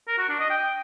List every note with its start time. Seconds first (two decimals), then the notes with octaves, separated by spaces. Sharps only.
0.08 A#4
0.18 F#4
0.29 D4
0.40 D#5
0.50 G5